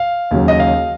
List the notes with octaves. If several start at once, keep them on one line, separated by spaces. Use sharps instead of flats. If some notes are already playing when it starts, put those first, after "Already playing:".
Already playing: F5
D#2 C#3 F#3
D#5
F5